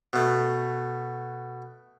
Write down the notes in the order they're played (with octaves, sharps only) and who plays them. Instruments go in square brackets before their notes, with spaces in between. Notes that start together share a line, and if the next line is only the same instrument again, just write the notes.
[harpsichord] B2 A3